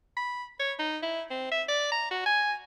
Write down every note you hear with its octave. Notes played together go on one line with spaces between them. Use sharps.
B5
C#5
D#4
E4
C4
E5
D5
A#5
F#4
G#5